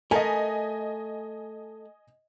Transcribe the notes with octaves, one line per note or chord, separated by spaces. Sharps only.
A3 A#4 D#5 G#5